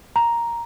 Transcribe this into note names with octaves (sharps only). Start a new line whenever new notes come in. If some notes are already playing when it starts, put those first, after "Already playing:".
A#5